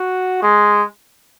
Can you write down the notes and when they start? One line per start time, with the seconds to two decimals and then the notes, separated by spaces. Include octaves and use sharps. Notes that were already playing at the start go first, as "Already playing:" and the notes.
Already playing: F#4
0.42 G#3